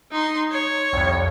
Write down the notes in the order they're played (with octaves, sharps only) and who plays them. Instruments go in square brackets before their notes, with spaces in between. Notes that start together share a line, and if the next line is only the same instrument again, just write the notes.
[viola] D#4 C6
C#5
[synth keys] C2 F2